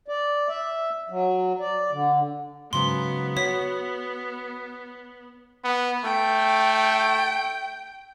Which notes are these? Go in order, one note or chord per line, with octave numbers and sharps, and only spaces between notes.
D5
E5
F#3
D5
D3
G#2 C#3 F#3 B3 C6
F#4 C#5 B6
B3
A3 G5